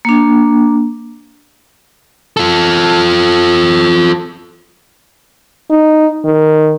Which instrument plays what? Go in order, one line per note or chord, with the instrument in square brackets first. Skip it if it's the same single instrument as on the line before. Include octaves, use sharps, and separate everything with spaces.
[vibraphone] A#3 D4
[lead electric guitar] F4 A4
[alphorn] D#4
D#3